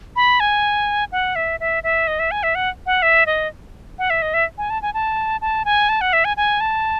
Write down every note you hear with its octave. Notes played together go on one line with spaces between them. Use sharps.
B5
G#5
F#5
E5
E5
E5
D#5
E5
G#5
E5
F#5
F#5
E5
D#5
F#5
E5
D#5
E5
G#5
A5
G#5
A5
A5
G#5
A5
F#5
E5
G#5
G#5
A5